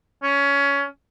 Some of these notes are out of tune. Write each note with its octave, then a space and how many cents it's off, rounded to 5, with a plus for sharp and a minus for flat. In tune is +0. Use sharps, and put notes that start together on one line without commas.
C#4 +20